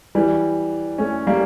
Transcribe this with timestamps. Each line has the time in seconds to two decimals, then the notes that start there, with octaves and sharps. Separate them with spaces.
0.15 E3 G3
0.98 A3 C#4
1.27 G3 A#3